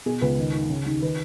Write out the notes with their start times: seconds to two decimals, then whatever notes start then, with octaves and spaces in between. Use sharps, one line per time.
0.06 B2 G#4
0.22 C#2 B4
0.38 D#3
0.54 G#2
0.70 C#3
0.86 D#2
1.02 D#3 B4